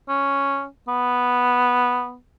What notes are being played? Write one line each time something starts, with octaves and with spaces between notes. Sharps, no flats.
C#4
B3